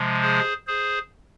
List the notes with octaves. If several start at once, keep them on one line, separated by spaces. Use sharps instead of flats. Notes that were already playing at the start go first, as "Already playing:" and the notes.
Already playing: C3 F3 G#3
G#4 C5
G#4 C5